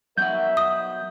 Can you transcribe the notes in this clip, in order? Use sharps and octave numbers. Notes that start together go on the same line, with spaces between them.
F#3 B3 A#4 E5 F#5 G6
D#6